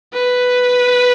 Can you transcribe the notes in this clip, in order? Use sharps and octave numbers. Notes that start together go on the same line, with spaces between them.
B4